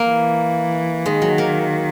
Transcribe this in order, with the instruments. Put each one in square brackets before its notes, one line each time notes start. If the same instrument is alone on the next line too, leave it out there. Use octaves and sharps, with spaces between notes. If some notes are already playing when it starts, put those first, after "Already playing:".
Already playing: [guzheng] A#3
[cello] E3
[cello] D#3 [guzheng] G#3
[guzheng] F#3
A#3